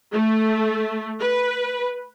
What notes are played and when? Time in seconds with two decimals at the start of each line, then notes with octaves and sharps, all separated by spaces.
0.12 A3
1.19 B4